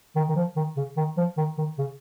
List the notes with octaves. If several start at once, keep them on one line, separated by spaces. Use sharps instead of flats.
D#3
D#3
F3
D#3
C#3
D#3
F3
D#3
D#3
C#3